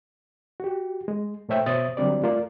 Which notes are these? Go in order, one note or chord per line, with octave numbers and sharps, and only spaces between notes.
F#4 G4
G#3
A#2 A3 C5 C#5 E5 G5
B2 C5 C#5 E5 D#6 A6
D3 F#3 G3 C4 G4 D5
A3 F4 A#4 D5